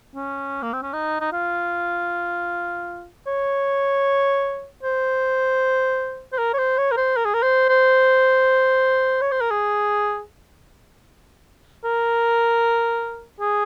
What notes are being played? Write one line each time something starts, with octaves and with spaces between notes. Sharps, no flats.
C#4
A#3
C4
C#4
D#4
D#4
F4
C#5
C5
C5
A#4
C#5
C5
C#5
A#4
C5
A#4
G#4
A#4
C5
C5
C#5
C5
A#4
G#4
A#4
G#4